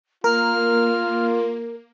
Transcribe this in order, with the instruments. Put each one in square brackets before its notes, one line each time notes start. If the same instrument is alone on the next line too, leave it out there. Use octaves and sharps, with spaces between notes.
[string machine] A#3 [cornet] F4 [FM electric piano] A#4 [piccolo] F6